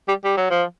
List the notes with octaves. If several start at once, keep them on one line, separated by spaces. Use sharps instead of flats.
G3
G3
F#3
F3